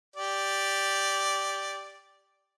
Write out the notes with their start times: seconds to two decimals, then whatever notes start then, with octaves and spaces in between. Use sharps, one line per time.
0.16 G4 D5